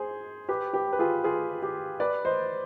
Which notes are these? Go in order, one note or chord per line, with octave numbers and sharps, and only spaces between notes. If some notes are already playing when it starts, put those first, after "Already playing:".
Already playing: G#4 C5
G4 B4
G4 B4
B4
F4 G#4
F4 G#4
G4
B4 D5
C5 D#5